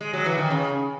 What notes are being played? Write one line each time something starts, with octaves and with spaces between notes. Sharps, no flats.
G#3
F#3
E3
D#3
C#3